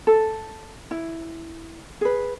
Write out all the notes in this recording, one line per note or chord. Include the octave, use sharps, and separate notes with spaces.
A4
E4
G#4 B4